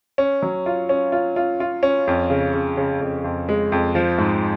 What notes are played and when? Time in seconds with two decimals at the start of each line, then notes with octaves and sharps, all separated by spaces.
0.18 C#4
0.43 F#3
0.66 F4
0.89 C#4
1.12 F4
1.36 F4
1.60 F4
1.83 C#4
2.07 F2
2.30 C#3
2.53 C#3
2.77 C#3
3.01 F2
3.24 F2
3.49 G#3
3.72 F2
3.95 F3
4.18 G#2